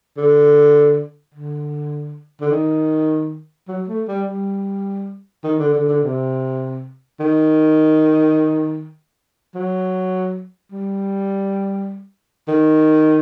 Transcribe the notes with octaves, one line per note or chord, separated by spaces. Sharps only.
D3
D3
D3
D#3
F#3
A3
G3
G3
D#3
D3
D3
D3
C3
D#3
F#3
G3
D#3